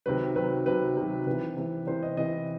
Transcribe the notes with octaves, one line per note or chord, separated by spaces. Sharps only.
C3 D#3 F#3 B4
C3 D#3 F#3 B4
C3 D#3 F#3 B4
C3 D#3 F#3
C3 E3 B4
C3 E3
C3 E3 C5
D#5
C3 E3 D#5